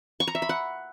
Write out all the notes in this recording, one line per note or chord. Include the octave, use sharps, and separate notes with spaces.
C#6
A#5
E5
B5
F#5